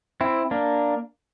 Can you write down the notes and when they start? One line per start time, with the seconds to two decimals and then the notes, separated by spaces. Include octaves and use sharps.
0.21 C4 E4
0.51 A#3 D4